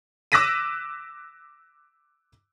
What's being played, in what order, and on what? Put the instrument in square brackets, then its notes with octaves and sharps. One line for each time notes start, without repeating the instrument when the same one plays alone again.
[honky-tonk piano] D6 E6 F#6 A#6 B6 D#7